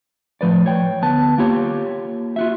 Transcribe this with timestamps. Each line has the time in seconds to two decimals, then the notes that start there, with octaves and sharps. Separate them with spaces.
0.41 A2 F3 B4 D5
0.66 C#5 G5
1.02 D2 B3 A5
1.38 A#3 F4 G4 C#5
2.36 F4 F#4 E5